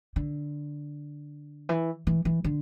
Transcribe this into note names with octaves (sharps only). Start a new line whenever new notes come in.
D3
E3
E3
E3
D3